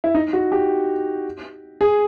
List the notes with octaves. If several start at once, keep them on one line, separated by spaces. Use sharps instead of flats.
E4
D#4
F#4
G4
G#4